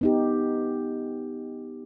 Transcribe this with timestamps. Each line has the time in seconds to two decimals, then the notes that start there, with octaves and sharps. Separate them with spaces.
0.01 B3 D#4 G4